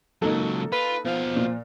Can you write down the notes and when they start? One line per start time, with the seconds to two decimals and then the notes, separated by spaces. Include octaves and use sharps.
0.22 C#2 F#3 A#3 D#4 A4
0.72 F4 B4
1.05 B2 F3 F5
1.36 A#2